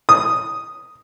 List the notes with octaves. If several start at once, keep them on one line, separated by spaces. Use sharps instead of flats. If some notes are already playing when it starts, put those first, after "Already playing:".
D#6